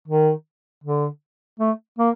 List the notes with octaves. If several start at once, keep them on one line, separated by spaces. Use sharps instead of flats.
D#3
D3
A3
A#3